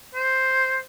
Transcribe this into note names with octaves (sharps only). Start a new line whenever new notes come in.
C5